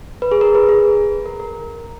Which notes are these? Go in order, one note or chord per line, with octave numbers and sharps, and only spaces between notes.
B4
G#4
A#4
B4
G#4
A#4
A#4